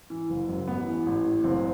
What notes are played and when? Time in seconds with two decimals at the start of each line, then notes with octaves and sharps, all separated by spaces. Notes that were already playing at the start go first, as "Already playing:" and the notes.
0.10 E3
0.30 F#1
0.49 F#2
0.67 A1 B3
0.88 E3
1.06 A1
1.25 A2
1.44 F#1 C4